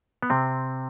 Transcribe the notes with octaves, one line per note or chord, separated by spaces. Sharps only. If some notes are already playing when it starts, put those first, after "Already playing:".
B3
C3 C4